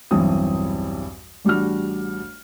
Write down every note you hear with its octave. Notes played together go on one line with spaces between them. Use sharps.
B1 E2 G2 E3 C4 D#6
A1 G3 D4 F#4 F6